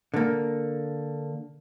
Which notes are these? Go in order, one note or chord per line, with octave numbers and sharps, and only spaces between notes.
D3 A#3